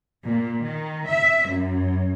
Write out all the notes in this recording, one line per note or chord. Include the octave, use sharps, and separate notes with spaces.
A#2
D#3
E5
F#2